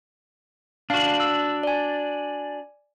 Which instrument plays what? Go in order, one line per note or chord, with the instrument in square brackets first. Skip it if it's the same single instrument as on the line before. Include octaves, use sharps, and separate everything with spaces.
[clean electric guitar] D4 F#4 [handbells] F5
[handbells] E6
D5 G#5